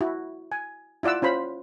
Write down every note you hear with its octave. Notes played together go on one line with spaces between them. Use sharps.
E4 F#4
G#5
E4 F4 D5 F#5 E6
C#4 F4 C5 B5